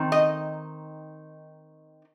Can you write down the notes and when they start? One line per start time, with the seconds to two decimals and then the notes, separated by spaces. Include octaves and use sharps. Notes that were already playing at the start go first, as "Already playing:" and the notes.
Already playing: D#3 C4 D#4
0.12 D#5